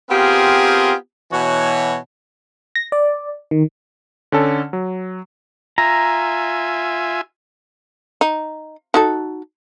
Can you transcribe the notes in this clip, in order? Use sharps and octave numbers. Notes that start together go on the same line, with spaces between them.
B3 C4 F4 G4 G#4 A#4
B2 E3 F#4 C#5
A#6
D5
D#3
D3 C#4 A4
F#3
F4 E5 G#5 A#5
D#4
D#4 F#4 A4